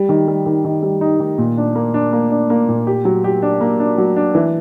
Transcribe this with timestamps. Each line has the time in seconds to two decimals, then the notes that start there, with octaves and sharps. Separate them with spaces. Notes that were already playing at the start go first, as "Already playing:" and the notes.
Already playing: G3
0.09 D#3
0.28 G3
0.46 D#3
0.64 D#3
0.83 G3
1.01 D#4
1.20 D#3
1.38 A#2
1.57 D4
1.76 A#3
1.94 D4
2.13 A#3
2.31 D4
2.50 A#3
2.68 A#2
2.87 G4
3.05 F#3
3.24 G4
3.42 D4
3.61 A#3
3.80 D4
3.98 F#3
4.16 D4
4.35 E3